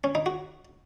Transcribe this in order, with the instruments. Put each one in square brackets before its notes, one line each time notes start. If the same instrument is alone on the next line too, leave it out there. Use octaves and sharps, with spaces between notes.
[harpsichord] C#4
D#4
F#4